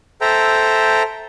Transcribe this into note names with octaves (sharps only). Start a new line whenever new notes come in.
A4 C5 E5 G5 A#5